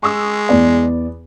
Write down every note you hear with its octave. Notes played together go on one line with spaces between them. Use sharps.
G#3 C#6 D#6 E6
E2 B3 D5